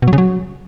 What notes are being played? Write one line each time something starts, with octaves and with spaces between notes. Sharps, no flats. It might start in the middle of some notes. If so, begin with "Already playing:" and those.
B2
F#3
C#3
F#3